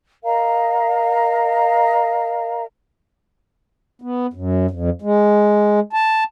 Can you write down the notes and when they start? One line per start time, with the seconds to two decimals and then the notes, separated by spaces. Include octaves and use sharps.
0.24 A#4 D#5 F5 A#5
4.02 B3
4.33 F#2
4.71 F2
5.02 G#3
5.93 A5